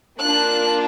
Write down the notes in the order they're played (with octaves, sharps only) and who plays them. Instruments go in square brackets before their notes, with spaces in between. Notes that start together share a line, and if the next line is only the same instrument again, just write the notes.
[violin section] A#3 D4 F4 F#6